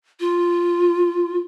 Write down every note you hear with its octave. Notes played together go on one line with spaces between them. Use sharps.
F4